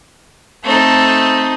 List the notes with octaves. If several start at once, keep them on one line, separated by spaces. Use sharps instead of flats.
A3 C4 D#4 A4